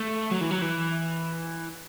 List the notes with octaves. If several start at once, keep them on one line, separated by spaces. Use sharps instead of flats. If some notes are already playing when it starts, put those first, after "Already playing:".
Already playing: A3
F#3
E3
F#3
E3